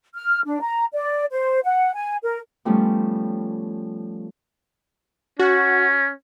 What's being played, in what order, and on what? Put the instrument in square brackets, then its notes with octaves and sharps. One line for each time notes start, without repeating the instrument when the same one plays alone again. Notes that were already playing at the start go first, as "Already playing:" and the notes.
[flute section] F6
D4
A#5
D5
C5
F#5
G#5
A#4
[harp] F3 G3 A3 B3 C#4
[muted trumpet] C#4 [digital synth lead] F#4